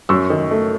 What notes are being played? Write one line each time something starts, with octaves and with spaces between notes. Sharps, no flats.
F#2 C#6 E6
D#3
A3